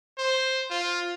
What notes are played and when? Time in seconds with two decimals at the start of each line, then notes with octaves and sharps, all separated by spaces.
0.18 C5
0.70 F4